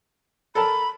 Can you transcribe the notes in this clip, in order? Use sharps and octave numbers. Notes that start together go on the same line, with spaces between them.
A4 A#4 A5 B5